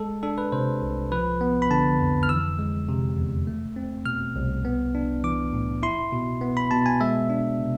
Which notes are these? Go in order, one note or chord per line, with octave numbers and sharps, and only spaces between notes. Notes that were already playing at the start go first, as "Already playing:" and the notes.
Already playing: G#3 A4
D4 A4
B4
C3 C5
C2
F3 B4
B3
B5
D3 A5
F2
F6
E3 E6
G#3
C3
E2
A3
C4
B2 F6
C2
B3
D4
E3 D6
A2
E4 C6
B2
B3
B5
B2 A5
G#5
G#3 E5
D4
C3